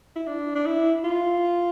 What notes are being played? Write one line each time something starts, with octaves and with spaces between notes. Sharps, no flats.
E4
D4
D4
E4
F4